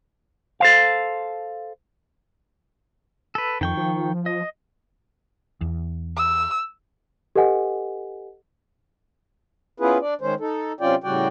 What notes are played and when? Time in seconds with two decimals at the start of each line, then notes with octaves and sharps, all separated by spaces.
0.60 A4 C5 F5
3.35 A4 B4
3.61 F2 D#3 G5 C#6
3.77 F3
4.26 D#5
5.61 E2
6.17 E6
7.35 G4 A4 B4 D#5 F#5 G#5
9.80 B3 C#4 E4 F4 G#4 B4
10.01 D4 D5
10.21 D#3 G#3 C#4 C5
10.40 D#4 A4
10.80 C3 F#3 C#4 F4 D5 G5
11.04 A2 C#3 G3 F#4 D5 G5